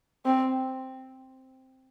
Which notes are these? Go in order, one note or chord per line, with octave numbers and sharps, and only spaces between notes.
C4